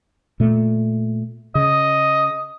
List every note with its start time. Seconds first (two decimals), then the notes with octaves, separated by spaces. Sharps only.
0.40 A#2 A3
1.55 C#3 D#5